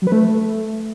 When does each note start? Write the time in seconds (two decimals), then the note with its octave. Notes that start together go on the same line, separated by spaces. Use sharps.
0.02 F#3
0.07 B4
0.12 A3